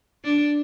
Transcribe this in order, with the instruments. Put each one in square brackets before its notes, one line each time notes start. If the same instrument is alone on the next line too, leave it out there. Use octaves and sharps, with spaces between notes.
[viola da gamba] D4